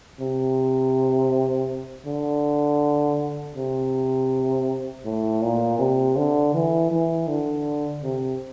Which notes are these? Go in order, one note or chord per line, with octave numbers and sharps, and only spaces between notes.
C3
D3
C3
A2
A#2
C3
D3
E3
E3
D3
C3